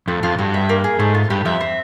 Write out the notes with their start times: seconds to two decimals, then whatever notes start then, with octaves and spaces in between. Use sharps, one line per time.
0.08 F2 A3
0.23 F2 F4
0.38 G2 F#4
0.54 E5
0.69 A#3
0.84 G#4
0.99 G#2 A3
1.15 F4
1.30 G2 G4
1.45 F2 E5
1.61 C4